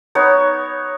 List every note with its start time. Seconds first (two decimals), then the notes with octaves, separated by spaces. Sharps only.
0.15 B3 D#4 C#5